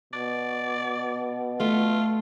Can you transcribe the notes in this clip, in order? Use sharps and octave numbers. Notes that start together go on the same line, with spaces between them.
B2 D5
A3 F4